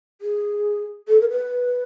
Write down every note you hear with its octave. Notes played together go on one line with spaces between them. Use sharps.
G#4
A4
A#4
B4